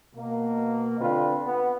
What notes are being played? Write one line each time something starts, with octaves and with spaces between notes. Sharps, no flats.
B2 A#3
D3 C4 F4 B4
B3